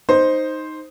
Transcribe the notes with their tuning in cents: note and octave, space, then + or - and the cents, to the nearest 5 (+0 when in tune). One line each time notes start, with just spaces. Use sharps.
D#4 +0 C5 +0